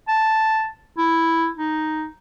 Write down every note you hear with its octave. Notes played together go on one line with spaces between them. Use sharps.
A5
E4
D#4